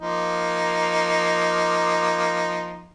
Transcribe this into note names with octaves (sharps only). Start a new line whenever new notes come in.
F3 A#3 D#4